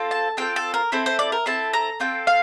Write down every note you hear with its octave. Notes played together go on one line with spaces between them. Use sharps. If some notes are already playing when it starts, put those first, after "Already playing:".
Already playing: C4 F4 A4
A5
C4 F4 A4 G5
A4
A#4
C4 E4 A4 C5
C5
D5
A#4
C4 E4 A4 A5
A#5
C4 F4 A4 G5
F5